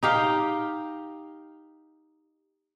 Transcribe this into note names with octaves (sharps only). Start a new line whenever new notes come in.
D#4 G4 F5 G5